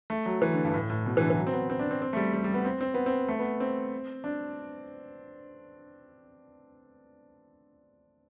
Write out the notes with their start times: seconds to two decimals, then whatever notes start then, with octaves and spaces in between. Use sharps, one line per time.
0.10 A3
0.26 F#3
0.42 E3
0.53 D3
0.65 G2
0.74 A2
0.90 A2
1.06 B2
1.17 E3
1.21 D3
1.30 E3
1.37 F#3
1.47 C4
1.53 B3
1.70 C4
1.79 D4
1.91 C4
2.02 C4
2.13 A3
2.17 G3
2.33 G3
2.44 G3
2.54 B3
2.65 C4
2.81 C4
2.94 B3
3.06 C4
3.28 A3
3.39 B3
3.60 C4
4.24 D4